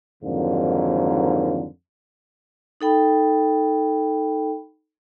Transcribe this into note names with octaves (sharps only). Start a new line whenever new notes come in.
F2 G#2 D3 D#3 F#3 A#3
D#4 A4 G5 B5